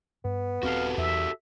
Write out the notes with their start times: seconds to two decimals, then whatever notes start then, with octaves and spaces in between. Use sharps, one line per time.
0.24 G2 B3
0.63 D#1 C4 F#4 G4 A4 F5
0.98 E2 E5